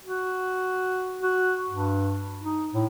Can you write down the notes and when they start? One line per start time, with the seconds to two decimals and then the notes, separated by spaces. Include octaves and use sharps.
0.05 F#4
1.23 F#4
1.69 G2
2.43 D#4
2.73 A2